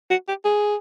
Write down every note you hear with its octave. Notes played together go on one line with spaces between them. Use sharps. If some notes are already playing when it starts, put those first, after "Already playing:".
F#4
G4
G#4